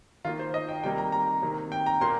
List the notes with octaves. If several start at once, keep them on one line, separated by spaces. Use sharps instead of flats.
D#3 A#3 F4
C5
D#5
G5
C3 D#3 G3 A#3 G5
A#5
A#5
C3 D#3 A#3
G5
A#5
A#2 A#3 C6